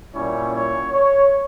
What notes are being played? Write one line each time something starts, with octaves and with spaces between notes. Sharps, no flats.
A#2 G3 C#4 E4 C#5
C#5
C#5